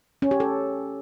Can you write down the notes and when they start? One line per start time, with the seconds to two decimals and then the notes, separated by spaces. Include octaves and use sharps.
0.22 C#4
0.31 G4
0.40 A4